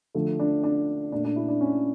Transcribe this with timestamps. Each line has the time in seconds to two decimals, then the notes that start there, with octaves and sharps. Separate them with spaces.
0.15 D3 F3 A3
0.39 D4
0.64 D4
1.12 A#2 A3 D4
1.25 D4
1.36 E4
1.48 D4
1.61 C#4